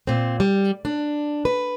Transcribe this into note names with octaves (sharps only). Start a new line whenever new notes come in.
A#2 C4
G3
D4
B4